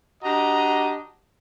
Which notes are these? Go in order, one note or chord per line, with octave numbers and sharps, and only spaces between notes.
D4 F#4 G4 D#5 A#5